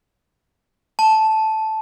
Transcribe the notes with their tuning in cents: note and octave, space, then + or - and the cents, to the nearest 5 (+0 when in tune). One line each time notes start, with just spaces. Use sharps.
A5 -10